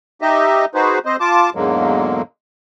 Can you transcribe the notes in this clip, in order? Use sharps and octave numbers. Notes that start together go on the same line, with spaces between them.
D#4 G4 D#5 E5
D#4 F#4 G#4 B4 C5
C4 C5 D#5
F4 A5 D6
E2 G#2 D3 F#3 G#3 A#3